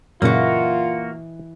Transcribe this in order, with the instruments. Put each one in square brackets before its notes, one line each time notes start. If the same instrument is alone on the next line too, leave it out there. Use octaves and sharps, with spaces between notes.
[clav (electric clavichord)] F#2 A#2 C#3 [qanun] E3 D#5 [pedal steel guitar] A#3 F#4 [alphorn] F4